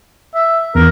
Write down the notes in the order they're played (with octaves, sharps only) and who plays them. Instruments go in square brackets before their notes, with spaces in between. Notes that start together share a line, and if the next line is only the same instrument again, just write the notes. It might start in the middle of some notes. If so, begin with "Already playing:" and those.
[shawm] E5
[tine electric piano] E2 [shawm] A#4